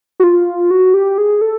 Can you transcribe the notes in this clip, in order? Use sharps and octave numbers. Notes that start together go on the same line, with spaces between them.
F#4
F4
F#4
G4
G#4
A4